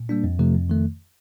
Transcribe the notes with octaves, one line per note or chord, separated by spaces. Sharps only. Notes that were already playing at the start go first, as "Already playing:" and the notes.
Already playing: A#2
G3 A#3 D4
F2
C3 F3 A3
F2
D#3 A3